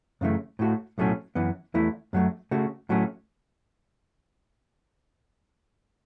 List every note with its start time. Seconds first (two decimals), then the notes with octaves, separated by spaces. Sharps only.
0.21 F#2 C#3 E3 A3
0.59 A2 A3 F#4
0.98 B1 A2 F#3 A3 C#4
1.35 F#2 E3 B3
1.74 E2 E3 A3 E4
2.13 F#2 F#3 A3
2.51 C#3 A3 F#4
2.89 A2 F#3 A3 C#4